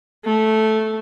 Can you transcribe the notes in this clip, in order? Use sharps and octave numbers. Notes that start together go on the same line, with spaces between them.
A3